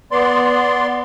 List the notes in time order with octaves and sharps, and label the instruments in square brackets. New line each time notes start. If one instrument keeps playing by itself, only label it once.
[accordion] B3 D5 C6